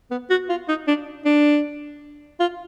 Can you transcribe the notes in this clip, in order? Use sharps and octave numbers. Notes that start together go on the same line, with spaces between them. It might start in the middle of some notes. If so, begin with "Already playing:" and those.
B3
F#4
F4
D#4
D4
D4
F4